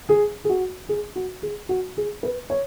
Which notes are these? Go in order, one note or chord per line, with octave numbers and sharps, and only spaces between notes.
G#4
G#4
F#4
G#4
F#4
G#4
F#4
G#4
B4
C#5